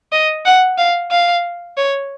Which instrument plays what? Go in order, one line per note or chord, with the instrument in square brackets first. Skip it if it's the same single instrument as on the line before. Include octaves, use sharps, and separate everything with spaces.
[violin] D#5
F#5
F5
F5
C#5